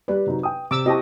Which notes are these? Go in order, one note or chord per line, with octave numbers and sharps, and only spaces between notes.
G3 G4 B4 D5
C3 F#3 D#4
G5 D#6
C3 D6 E6
C4 E4 F#4 G4 D#5 A5